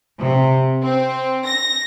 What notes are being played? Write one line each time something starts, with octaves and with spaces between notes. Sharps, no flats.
C3
C4
A#6